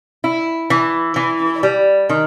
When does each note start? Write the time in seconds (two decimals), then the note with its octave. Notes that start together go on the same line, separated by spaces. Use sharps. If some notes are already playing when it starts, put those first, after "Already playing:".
0.24 E4
0.70 E3
1.16 E3
1.63 G3
2.09 D#3